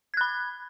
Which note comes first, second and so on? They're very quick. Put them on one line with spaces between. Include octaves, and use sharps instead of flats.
G#6 F#6 B5